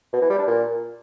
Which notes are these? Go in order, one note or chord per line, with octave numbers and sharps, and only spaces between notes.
B2
E3
G3
D4
A#2